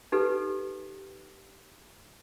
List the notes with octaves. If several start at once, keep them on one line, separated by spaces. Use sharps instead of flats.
D#4 G4 A4 B4